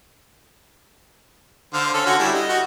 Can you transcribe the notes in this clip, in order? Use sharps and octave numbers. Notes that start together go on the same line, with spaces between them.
D3 C5 F5
C#4 A4
D3 F#4 G#5
G3 E4
D#5
F#4